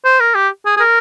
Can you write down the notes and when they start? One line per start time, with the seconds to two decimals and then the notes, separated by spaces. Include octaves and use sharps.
0.04 C5
0.20 A#4
0.35 G4
0.65 G#4
0.77 G#4
0.80 A#4